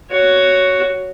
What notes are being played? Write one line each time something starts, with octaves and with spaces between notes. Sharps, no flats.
F#4 C#5